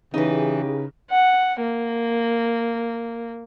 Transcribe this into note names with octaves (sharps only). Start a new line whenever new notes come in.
C#3 E3 D#4 E4 G4 G#4 B4
F#5
A#3